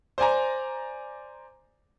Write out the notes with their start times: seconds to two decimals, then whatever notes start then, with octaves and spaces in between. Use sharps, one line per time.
0.18 C5 D5 G#5 A#5